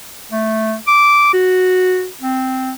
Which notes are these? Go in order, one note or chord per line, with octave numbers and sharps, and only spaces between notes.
A3
D6
F#4
C4